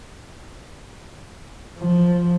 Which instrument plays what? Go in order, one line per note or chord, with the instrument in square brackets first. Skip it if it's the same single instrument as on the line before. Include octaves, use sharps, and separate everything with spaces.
[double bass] F3